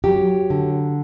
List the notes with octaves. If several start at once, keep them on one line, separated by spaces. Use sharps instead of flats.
F#3 G4
D3